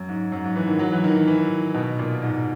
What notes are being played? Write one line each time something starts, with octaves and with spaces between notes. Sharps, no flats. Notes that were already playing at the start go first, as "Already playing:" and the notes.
Already playing: F#2
G#2
F#2
G#2
E3
D#3
F#3
E3
D#3
E3
E3
B2
A#2
G#2